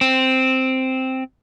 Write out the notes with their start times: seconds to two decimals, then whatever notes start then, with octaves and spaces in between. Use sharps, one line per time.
0.01 C4